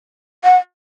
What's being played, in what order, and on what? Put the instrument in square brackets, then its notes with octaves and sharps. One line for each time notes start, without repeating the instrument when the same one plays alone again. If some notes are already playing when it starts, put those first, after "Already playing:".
[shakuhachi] F#5